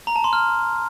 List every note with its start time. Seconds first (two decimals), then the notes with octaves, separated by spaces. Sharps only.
0.07 A#5
0.16 A5
0.24 C6
0.33 F6